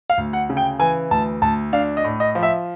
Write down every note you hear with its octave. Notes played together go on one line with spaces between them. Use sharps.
F5
D2
F#5
C#3
G5
E3 G#5
D2 A5
D2 A5
D4 F5
D#5
A2
D#5
F3
E5